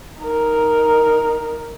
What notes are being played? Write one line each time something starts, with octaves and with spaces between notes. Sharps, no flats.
D#4 A#4